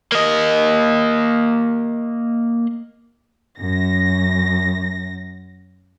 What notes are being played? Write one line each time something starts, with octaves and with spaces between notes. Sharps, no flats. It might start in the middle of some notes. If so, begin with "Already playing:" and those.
A#3 D#5
F#2 A#6